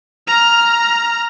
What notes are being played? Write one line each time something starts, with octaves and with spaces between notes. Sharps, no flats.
A#5 F6